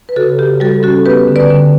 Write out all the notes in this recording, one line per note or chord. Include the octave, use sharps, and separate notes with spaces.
B4
C#3 F#4 A4
C#3 G4
G3 F#4 A4
C#4 F#4 A4
B3 G4 B4
D3
B4 D5
D3